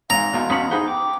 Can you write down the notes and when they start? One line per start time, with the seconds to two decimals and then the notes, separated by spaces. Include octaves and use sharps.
0.10 G#1 G#2 F5 A#5
0.33 B1 E2 B2 F5
0.50 B1 E2 B2 B3 C#4 B5
0.71 D#4 G#4 C5 F#5 B5
0.88 G5 D6